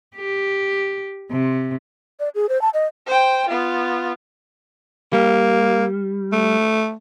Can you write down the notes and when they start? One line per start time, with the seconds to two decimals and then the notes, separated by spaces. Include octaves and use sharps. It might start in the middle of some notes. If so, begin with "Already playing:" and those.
0.16 G4
1.31 C3
2.20 D5
2.35 G#4
2.49 C5
2.62 A5
2.74 D#5
3.07 C5 G5
3.49 B3 F4
5.13 G3 A#3
6.33 A3